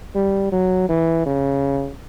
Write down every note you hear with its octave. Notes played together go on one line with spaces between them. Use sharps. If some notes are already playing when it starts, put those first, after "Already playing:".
G3
F#3
E3
C#3